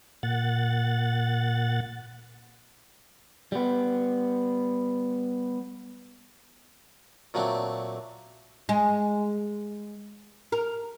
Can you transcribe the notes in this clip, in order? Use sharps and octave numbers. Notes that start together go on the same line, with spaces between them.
A#2 F#5 A6
G3 B3
A#2 F#3 A3 C4 D4
G#3
A#4